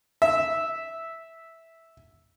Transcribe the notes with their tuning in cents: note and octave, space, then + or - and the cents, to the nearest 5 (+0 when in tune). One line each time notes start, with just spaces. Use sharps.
E5 -5